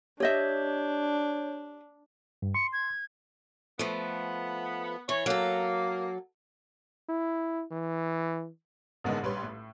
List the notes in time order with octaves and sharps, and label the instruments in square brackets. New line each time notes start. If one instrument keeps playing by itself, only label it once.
[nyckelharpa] D4 [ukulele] G4 D#5 E5 [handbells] C#5 G6
[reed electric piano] G2
[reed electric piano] C6 [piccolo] C#7
[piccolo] G#6
[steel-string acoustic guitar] F3 A3 [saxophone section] B3
[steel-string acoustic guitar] E3 [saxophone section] C#5
[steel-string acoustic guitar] F#3 A4 [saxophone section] A#3
[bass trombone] E4
E3
[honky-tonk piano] A1 D3 G#3 A#3 B3 D#4
A#1 G3 B4 C#5 C6
A2